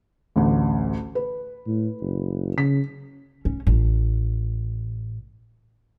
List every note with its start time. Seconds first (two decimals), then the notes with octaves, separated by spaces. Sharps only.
0.36 A1 D2
1.15 B4
1.67 A2
2.02 F#1
2.58 C#3 B6
3.45 C#4
3.67 A1